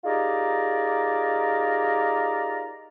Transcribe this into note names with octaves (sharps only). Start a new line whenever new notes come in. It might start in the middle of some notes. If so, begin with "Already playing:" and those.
D#4 F4 G4 G#4 A#4 D5